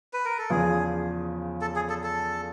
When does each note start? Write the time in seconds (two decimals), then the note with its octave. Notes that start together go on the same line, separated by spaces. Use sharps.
0.13 B4
0.25 A#4
0.38 A4
0.50 E2 C#3 F3 G#4
1.61 A4
1.76 G#4
1.89 A4
2.04 A4